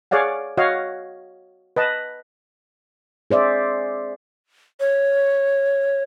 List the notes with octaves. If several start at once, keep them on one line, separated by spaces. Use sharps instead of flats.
G#4 C#5 D5 F5 F#5
F#4 C#5 D#5 F5
B4 D#5 A5
G#4 C5 D5 E5
C#5